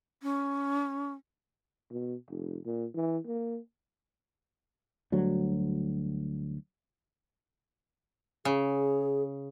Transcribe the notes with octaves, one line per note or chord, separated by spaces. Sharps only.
C#4
B2
F1
A#2
E3
A#3
D2 F#3 G3
C#3 G#4